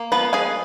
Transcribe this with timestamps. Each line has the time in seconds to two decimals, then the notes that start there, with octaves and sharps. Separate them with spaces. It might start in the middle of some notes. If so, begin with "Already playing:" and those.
Already playing: A#3
0.12 F3 B3 B4
0.33 F3 G#4 G#5